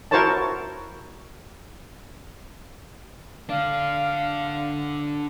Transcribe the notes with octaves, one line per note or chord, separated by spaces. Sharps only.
E4 F#4 A#4 C5 C#5 A5
D3 D4 F5